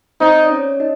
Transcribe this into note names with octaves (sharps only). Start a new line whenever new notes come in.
C4 D#4 C5
D5
C#4 C#5
D#4 D#5